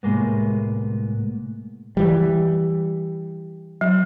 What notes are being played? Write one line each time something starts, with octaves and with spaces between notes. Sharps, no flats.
C2 A2 G#3 A#3 B3
E3 G3
F#3